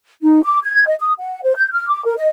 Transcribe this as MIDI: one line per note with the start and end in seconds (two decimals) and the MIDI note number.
0.23 0.42 63
0.43 0.59 86
0.64 0.86 92
0.86 0.95 75
1.00 1.13 87
1.19 1.42 78
1.43 1.56 72
1.56 1.71 91
1.71 1.87 89
1.89 2.02 86
2.05 2.14 70
2.17 2.28 75